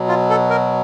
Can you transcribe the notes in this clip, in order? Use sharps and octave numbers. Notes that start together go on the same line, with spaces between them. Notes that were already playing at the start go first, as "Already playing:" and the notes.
Already playing: B2 F#3
F4
A4
A#4